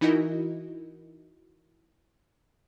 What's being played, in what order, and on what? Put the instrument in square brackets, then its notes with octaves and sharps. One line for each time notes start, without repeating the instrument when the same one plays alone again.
[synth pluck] E3 D#4 E4 F#4 A#4 D#5